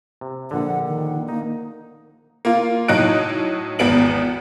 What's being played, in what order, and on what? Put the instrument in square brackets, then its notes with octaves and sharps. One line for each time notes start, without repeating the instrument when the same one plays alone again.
[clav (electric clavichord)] C3
[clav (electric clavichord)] A#1 D3 [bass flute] F#5
[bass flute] D#3
[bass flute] A#3 [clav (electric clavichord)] D#4
[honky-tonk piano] A#3 F4
A2 F#3 D#4 D#5 F#6 D7
G#1 E2 B3 D7 F#7